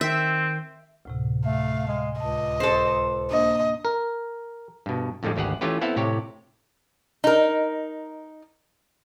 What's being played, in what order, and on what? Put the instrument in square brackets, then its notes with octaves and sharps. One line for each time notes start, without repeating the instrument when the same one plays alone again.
[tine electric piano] D#3 G5 [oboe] C4 [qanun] E5
[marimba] D2 A2 C3
[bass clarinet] A3 [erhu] F5
[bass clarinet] G#3
[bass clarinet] C#2 [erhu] D#5 [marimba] A5
[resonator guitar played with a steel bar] A4 C5
[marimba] A#3 D4 [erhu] D#5
[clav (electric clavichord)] A#4
G2 B2
F2 A2 D3 G3 G#3
G#1 D2 G4 G#4 F#5
E3 A3 C#4 F4 G4 B4
B3 C4 E4 A4 F5
A2 C3 G4 C#5
[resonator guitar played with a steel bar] D#4 A#4